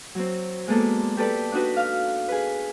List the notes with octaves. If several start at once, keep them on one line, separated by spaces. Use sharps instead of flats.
F#3 C4
G#3 A#3 B3 A4 D5
G4 A4 B4 D5
D4 D#4 F#4 B4
F5 F6
G#4 B4